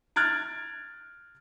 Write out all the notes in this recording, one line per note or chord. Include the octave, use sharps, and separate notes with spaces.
F6 F#6 G#6 A6 D7